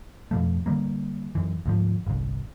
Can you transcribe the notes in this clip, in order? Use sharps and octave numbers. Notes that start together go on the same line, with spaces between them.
F2 B2 F3 A3
D3 E3 G3 A#3
F#2 E3
D2 G#2 F3
G1 C2